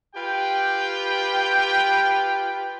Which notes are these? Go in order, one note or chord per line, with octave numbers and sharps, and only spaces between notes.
F4 G4 B4 G5